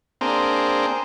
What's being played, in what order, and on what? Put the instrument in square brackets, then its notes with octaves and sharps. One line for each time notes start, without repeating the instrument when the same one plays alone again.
[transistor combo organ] A#3 C4 D4 G#4 C5 A#5